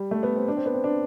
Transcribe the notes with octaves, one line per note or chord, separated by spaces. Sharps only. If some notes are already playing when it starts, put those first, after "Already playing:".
Already playing: G3
A3
B3
C4
D4
C4
B3
C4
D4